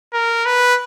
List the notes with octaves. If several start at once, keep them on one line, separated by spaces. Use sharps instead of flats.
A#4
B4